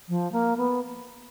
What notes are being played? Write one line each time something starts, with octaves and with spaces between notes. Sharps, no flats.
F3
A#3
B3